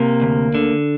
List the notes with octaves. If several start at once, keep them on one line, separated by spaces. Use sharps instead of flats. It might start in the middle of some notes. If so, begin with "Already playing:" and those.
Already playing: C3 A#3
D2
D3